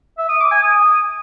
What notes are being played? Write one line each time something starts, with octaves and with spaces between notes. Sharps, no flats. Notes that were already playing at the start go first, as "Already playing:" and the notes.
E5
D#6
D6
G#5
D#6